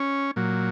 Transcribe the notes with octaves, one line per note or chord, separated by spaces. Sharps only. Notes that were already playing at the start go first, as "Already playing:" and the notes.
Already playing: C#4
A#2 F#3